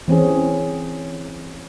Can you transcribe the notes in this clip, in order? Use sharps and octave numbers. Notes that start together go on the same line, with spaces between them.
E3 C4 C#4 G#4